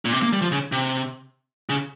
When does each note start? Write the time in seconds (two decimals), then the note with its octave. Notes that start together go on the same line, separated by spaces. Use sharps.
0.05 A#2
0.13 C3
0.23 A#3
0.33 G3
0.42 F3
0.52 C#3
0.72 C3
1.69 C#3